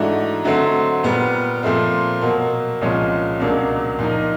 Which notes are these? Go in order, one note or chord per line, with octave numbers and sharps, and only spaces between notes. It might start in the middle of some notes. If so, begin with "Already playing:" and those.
Already playing: G#2 E3 A3 D4 F#4
D3 F#3 A3 C4
A#2 G3 B3
A#2 F3 A3 C4
B2 F#3 A#3
C2 A#2 F3 G#3 C#4
C#2 B2 F#3 A#3 D4
A#2 F3 A#3 D#4